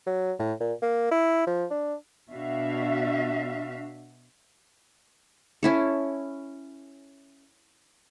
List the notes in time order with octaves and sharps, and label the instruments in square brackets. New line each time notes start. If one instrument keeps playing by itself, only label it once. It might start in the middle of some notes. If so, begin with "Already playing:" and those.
[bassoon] F#3
A2
A#2
A#3
E4
F3
D4
[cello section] B2 D4 F#4 E5 F5
[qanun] C#4 E4 A4